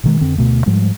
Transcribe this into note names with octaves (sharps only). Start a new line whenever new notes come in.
B2 D#3 G#3
F2 D3 C4
D2 B2 A3
G#2 F3 G3 G#3